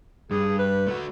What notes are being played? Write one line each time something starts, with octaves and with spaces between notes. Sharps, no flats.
G2 G#4
B4
A3 F#4